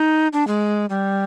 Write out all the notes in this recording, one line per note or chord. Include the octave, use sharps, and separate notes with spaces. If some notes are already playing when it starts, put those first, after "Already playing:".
Already playing: D#4
D4
G#3
G3